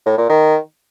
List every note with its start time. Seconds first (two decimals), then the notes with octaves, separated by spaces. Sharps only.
0.06 A2
0.18 A#2
0.29 D#3